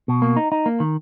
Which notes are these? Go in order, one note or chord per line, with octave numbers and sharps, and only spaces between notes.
B2
A#3
D#4
D#4
A#3
D#3